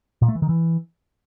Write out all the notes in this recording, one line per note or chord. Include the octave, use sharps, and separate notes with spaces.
A#2
A3
E3
D#3
E3